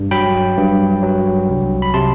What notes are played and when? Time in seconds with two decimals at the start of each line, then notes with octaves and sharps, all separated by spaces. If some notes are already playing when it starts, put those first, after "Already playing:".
Already playing: G2
0.11 F#3 G5 B5
0.57 G2
1.03 F#3
1.49 C2
1.82 B5
1.94 C3 A5 C6